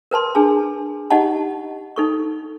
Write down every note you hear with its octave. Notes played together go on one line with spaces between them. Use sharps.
A#4 B4 A5 C6
D4 G#4 A5
D#4 G4 D#5 F#5 A5
D#4 A4 C#6